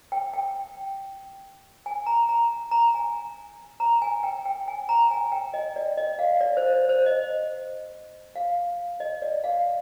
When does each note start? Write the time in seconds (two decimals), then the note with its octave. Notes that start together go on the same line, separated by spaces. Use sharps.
0.12 G5
0.33 G5
1.86 G#5
2.06 A#5
2.29 A#5
2.71 A#5
2.94 G#5
3.80 A#5
4.02 G#5
4.23 G5
4.46 G5
4.68 G#5
4.89 A#5
5.11 G#5
5.32 G5
5.54 D#5
5.76 D5
5.97 D#5
6.19 F5
6.41 D5
6.57 C5
6.74 C5
6.89 C5
7.06 D#5
8.36 F5
9.00 D#5
9.22 D5
9.44 F5